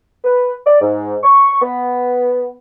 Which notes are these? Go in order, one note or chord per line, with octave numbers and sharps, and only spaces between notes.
B4
D5
G#2
C#6
B3